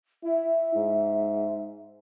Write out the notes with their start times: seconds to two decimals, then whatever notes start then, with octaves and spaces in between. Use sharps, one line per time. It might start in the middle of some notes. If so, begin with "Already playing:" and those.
0.24 E4 E5
0.75 G#2